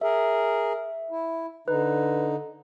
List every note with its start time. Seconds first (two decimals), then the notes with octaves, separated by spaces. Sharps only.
0.01 G#4 A#4 E5
1.11 E4
1.68 D3 D#4 B4